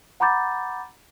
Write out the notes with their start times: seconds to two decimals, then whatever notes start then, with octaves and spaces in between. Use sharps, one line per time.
0.20 F#5 A#5 B5 D6 G6 A6